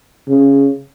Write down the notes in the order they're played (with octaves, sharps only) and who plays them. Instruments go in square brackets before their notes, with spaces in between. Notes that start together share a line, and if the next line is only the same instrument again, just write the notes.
[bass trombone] C#3